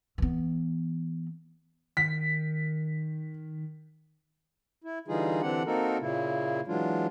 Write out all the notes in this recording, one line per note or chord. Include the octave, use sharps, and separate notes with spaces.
E3 B3
D#3 B6
E4
D3 E3 G3 D#4 F4 G#4
D3 E3 C4 D4 G4 F#5
A#3 C4 D#4 F#4 A4 A#4
A#2 C#3 A#3 E4
E3 F#3 G#3 D4 F4